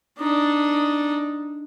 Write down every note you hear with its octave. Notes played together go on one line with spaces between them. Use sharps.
D4 D#4